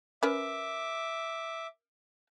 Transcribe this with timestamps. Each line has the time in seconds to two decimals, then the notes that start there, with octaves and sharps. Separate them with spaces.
0.23 C#4 A#4 B4 E5 D6